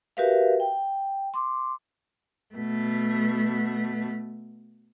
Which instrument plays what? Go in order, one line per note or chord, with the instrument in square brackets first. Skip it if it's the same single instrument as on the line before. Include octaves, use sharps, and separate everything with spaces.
[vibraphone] F#4 G4 A#4 B4 E5 F5
G5
C6 D6
[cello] B2 A3